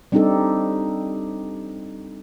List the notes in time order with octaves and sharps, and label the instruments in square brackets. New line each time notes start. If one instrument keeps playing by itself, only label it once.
[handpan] G3 C4 D4 D#4 G4 A4